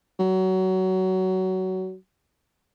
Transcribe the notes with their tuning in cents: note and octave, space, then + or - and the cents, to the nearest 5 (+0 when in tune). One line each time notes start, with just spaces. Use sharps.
F#3 +20